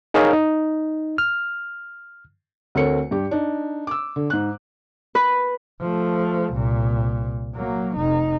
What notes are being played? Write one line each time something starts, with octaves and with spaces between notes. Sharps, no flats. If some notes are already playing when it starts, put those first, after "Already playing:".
D#4 G#4 A#4 C#5 F5
D#4
F6
D2 A3 C4 A#4 C#5 C#7
G2 G4
D4 D#4
D6 E6
D3
G#2 F#6
B4
F3 A3
C2 A#2
F#3 A#3
F1 D#4